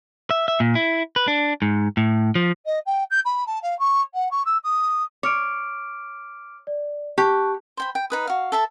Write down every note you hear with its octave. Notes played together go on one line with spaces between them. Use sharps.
E5
E5
A#2
E4
B4
D4
G#2
A2
F3
D#5
G5
G6
B5
A5
F5
C#6
F#5
C#6
E6
D#6
C#5 D6 F6 D7
D5
G4 A5 C#6 F#6
C5 G5 B5
G5
D#4 B4 D#6
F#4 F5
A4 E5 A5